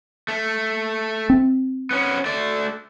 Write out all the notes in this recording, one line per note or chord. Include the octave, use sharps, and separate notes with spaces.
A3
C4
B3 C#4
A3 D5